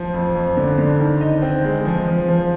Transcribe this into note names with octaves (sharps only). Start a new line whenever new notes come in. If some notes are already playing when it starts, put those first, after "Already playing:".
Already playing: F3
F2
F2
D3
D3
D#3
D#4
C4
G#3
F3
F3
F3